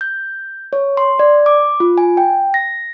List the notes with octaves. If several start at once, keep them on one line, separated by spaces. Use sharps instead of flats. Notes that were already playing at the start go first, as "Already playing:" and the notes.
G6
C#5
C6
D5
D6
F4
G#5
G5
A#6